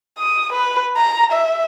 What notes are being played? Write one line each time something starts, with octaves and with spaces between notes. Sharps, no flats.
D#6
B4
A#5
E5